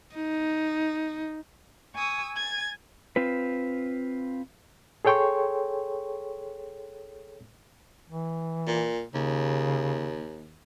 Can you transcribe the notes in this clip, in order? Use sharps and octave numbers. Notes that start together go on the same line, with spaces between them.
D#4
G#5 C#6 D#6 E6
G#5 G#6 A6
C4 F4 B4
G#4 A4 C#5 G5 C6 C#6
E3
A#2
D#2 C#3